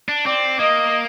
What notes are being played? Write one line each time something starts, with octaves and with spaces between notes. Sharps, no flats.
D4
C4 D5
A#3 D#5